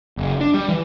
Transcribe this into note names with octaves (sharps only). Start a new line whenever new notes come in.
F#1
D4
G3
E3